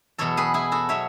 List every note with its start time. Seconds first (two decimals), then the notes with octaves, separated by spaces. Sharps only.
0.18 E2 B2 F#3 A4 C#5
0.37 G#4 B4
0.54 E4 G#4
0.72 F#4 A4
0.89 B2 F#3 C#5 E5